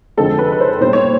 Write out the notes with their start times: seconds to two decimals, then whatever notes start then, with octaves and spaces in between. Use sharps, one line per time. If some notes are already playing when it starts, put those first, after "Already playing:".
0.17 F2 D3 F3 G#3 C4 A4
0.39 B4
0.52 B4
0.60 C5
0.80 A#1 A#2 G3 B3 C5
0.93 C#5